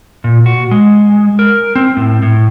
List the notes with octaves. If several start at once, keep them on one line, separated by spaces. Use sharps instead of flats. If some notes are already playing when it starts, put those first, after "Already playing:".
A#2
F#4
G#3
A#4
C4
A2
A2